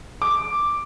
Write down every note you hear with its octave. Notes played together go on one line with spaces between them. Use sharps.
D6